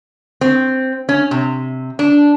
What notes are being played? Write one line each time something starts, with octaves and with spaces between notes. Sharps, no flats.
C4
C#4
C3
D4